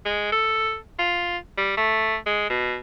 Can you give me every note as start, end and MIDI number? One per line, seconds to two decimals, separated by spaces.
0.05 0.31 56
0.32 0.76 69
0.99 1.37 65
1.57 1.72 55
1.77 2.16 57
2.26 2.47 56
2.50 2.77 47